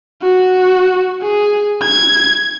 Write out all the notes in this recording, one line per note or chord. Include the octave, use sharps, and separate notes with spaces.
F#4
G#4
G#6